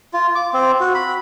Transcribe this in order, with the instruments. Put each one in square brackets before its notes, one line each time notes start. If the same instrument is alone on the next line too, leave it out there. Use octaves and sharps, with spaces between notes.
[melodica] F4
D6
C4
F#4
B5